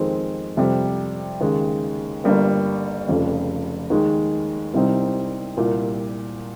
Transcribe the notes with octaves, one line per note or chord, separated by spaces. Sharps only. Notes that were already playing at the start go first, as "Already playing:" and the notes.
Already playing: F2 D#3 G#3 C4
F2 C3 G3
D#2 C#3 G#3
G1 G2 G3 A#3
F1 F2 C#3
D#2 D#3 G#3
C2 C3 G3 C4 D#4
C2 A#2 G3